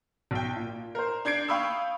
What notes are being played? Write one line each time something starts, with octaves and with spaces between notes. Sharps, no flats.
B1 G5
A#2
A#4 C5
D4 G6 G#6 C7 D7
F5 G5 B5 C#6 D#6 E6